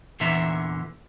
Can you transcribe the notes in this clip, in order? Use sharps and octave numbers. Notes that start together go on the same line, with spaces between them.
E2 A#2 D3 E3 E5 A#5